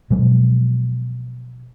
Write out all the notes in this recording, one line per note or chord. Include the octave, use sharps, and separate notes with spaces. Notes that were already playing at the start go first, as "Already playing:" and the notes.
B2 F3 F#3 G#3